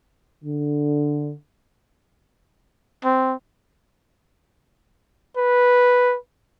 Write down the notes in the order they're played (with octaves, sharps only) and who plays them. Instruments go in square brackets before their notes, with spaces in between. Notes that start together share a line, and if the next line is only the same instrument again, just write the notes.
[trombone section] D3
[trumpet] C4
[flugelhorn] B4